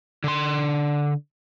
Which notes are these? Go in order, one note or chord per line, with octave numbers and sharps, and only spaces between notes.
D3 C6